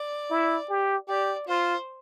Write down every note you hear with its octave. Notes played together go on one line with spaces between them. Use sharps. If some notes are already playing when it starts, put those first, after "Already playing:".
Already playing: D5
E4
G4
G4 D5
F4 C5